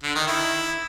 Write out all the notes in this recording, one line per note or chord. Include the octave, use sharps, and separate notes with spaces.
D3
D#3
E4